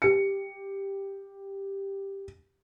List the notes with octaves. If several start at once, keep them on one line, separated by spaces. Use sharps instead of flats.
G4 C#7